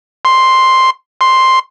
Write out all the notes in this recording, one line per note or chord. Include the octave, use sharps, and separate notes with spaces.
C6
C6